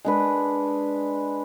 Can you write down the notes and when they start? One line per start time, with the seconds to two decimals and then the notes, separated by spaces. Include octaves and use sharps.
0.05 G#3 D4 B4